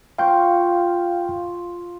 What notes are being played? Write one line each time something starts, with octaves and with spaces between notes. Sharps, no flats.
F4 F5 G5 C#6 G6